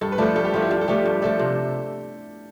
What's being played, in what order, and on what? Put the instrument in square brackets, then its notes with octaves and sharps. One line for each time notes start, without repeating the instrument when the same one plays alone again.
[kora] G2 [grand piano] A4
[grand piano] B4
[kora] F3 A3 D4 [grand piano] A4
[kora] G2 [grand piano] A4
[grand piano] G4
[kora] F3 A3 D4 [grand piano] F4
[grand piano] E4
[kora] G2 [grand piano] F4
[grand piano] A4
[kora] F3 A3 D4 [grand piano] G4
[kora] G2 [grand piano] G4
[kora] F3 A3 D4 [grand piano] A4
[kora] C3